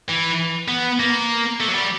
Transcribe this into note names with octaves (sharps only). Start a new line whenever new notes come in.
E3
B3
A#3
A3
F#3
G3